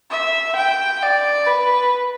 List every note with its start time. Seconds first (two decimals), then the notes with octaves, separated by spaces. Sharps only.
0.10 E5
0.56 G5
1.02 D5
1.47 B4